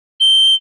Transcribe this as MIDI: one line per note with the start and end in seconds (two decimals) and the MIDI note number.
0.20 0.55 103